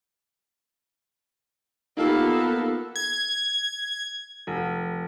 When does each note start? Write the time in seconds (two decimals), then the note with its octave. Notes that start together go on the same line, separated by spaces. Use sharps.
1.97 A#3 B3 D#4 F4 G4 A4
2.96 G#6
4.47 F1